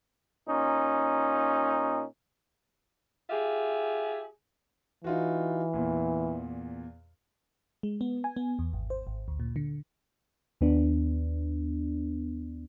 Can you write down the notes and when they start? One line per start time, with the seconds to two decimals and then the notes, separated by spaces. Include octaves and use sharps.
0.48 A#2 C#4 D#4
3.30 F4 G4 G#4 E5
5.04 E3 D#4 F4 F#4
5.73 E2 A#2
7.83 G#3
8.01 B3
8.24 G#5
8.36 B3
8.59 E2
8.73 G#1
8.90 C5
9.07 G#1
9.28 D2
9.40 A#2
9.56 D3
10.61 D#2 B3 D4